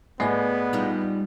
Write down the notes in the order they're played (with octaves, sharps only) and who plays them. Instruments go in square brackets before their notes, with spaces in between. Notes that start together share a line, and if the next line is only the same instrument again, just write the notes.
[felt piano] A2 G#5 C7 [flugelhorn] B3 [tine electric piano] G#4 D5 D#5
[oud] G3 D#4 F4